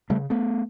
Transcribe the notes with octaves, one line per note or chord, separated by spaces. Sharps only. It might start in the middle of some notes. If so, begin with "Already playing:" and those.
C#3 G3 A3
A3 B3